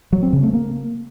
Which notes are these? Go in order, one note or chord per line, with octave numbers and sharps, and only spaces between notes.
F#3
C4
C#3
A3
A#3